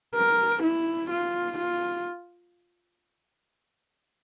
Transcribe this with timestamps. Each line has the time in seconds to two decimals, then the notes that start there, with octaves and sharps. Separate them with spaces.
0.15 A#4
0.63 E4
1.11 F4
1.58 F4